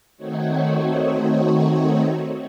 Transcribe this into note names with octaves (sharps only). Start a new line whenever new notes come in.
D#3 A3 C4 D#4 F#4 C#5